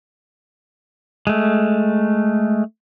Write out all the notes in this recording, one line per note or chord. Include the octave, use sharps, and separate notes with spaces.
G#3 A3